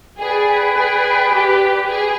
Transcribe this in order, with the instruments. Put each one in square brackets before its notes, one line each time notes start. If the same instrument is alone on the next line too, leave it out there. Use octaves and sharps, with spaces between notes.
[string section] G#4 [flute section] B4 D5 G5 B5
[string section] G#4
G4
G#4